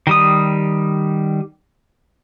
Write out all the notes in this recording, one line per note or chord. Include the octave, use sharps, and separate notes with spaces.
D#3 G3 D#6